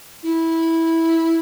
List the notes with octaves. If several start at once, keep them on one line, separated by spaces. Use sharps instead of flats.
E4